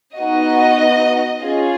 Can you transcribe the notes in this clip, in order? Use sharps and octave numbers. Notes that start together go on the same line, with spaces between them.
B3 D#4 F#4 D#5
C#4 F4 G#4